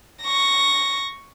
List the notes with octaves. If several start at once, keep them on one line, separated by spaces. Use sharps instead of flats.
C#6 A#6